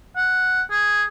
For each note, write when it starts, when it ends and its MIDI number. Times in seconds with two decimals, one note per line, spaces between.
0.17 0.62 78
0.71 1.04 68